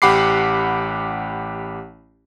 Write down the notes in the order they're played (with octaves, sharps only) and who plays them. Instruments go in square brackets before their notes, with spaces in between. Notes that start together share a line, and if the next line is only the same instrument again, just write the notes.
[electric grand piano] A1 G4 F#5 B5 D6 C7